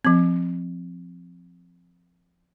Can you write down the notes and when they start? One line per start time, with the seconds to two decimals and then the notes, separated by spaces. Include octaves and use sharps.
0.05 F3 C4